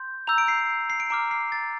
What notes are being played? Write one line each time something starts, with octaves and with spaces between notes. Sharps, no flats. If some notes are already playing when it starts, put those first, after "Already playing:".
Already playing: C6 G6
A#5 E6 G6 F7
D7
C7
C7
D7
A#5 D6 F6 D7
C7
A6